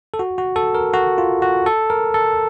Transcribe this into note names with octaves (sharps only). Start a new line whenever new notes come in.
A4
F#4
F#4
A4
A#4
F#4
F4
F#4
A4
A#4
A4